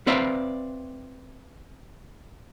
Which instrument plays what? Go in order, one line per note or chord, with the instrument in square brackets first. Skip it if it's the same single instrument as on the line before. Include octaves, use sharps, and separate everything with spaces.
[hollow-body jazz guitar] C4 B4 D5 E5 F5